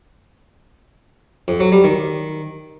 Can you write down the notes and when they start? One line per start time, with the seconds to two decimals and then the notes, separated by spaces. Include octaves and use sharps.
1.48 F2
1.60 F#3
1.72 G3
1.84 D#3